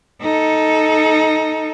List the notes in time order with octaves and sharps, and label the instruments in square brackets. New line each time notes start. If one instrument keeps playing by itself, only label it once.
[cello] D#4 A4